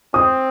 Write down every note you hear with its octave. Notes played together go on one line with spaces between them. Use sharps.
C4 D#6